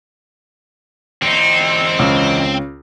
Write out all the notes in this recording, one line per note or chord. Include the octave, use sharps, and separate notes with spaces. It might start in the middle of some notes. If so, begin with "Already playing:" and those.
E2 C4 D#4
C#2